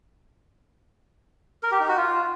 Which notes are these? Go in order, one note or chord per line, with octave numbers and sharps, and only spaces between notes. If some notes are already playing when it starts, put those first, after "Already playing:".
A#4
G4
D#4
F#4
F4